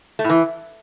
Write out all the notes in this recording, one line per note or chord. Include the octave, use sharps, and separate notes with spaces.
A3
A2
E3